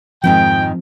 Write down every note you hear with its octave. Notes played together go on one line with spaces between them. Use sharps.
F2 G#2 D#3 F3 C4 G5